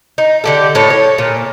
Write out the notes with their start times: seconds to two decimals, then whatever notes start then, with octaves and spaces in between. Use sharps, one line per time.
0.18 D#4
0.44 D3 G4 A4
0.75 A2 A4 C#5
0.90 C#5
1.18 A#2